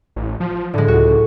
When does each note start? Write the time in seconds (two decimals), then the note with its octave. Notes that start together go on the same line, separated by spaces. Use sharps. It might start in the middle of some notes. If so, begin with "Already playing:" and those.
0.16 A1
0.40 F3
0.74 A2 D3 G#3
0.88 C#2 F#4